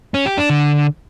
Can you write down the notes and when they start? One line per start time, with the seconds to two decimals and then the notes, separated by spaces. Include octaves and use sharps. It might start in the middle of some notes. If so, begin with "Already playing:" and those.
0.14 C#4
0.26 G4
0.38 D4
0.50 D3